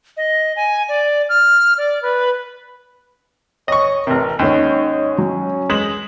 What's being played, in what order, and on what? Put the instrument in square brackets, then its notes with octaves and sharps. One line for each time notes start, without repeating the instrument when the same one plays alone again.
[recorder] D#5
G#5
D5
F6
D5
B4
[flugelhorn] C#5 [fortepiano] D#5 C#6
[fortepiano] A1 C3 [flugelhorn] A#4
[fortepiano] D#2 [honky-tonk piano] G#2 C#4 C#5 [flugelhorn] D#5
[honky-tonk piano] F#3 [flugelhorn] C#4
[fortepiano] G#3 [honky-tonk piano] B6 E7 F#7